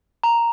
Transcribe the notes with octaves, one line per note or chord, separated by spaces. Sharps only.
A#5